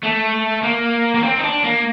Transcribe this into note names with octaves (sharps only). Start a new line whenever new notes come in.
A3
A#3
A#3
C4
D#4
D4
A#3